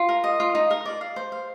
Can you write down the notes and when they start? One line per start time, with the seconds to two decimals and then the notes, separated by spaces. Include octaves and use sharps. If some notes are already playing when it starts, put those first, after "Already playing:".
Already playing: F4
0.09 A#4
0.24 D#5
0.40 F4
0.55 D#4
0.71 A#4
0.85 D5
1.01 F5
1.16 C5
1.32 F5